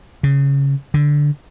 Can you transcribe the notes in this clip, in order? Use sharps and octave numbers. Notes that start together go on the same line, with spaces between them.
C#3
D3